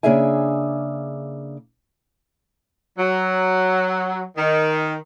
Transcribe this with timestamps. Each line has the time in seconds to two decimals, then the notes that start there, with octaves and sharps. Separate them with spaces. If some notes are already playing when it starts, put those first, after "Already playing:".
0.03 C#3 A#3 D4 G#4 E5 G#5
2.98 F#3
4.37 D#3